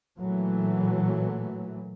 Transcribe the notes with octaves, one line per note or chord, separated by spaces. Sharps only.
A#2 E3 F#3 A3